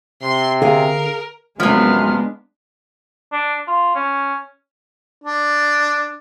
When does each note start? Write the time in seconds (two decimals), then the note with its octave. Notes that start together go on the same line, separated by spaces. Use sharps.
0.22 C3 C6
0.62 D3 G#4 A#4 F5
1.60 F#2 C3 F3 G#3 B3 D4 F6
3.33 D4
3.68 F4
3.95 C#4
5.23 D4